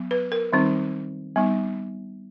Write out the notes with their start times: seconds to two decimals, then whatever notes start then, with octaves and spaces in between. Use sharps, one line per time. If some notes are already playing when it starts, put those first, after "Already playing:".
Already playing: F#3 B3
0.11 B4
0.32 A#4
0.52 D#3 G3 C4 D#4
1.36 G3 B3 D#4